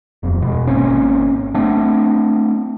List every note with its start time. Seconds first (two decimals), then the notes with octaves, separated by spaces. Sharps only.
0.23 D#1 F2
0.42 B2 G#3
0.67 G#1 A#3 C4 C#4
1.55 A3 B3 C4 D4